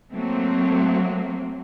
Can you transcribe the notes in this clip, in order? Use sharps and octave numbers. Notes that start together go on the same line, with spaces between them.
F#3 A3 A#3 C4